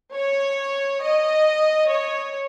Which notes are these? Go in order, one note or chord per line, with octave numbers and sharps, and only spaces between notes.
C#5
D#5
C#5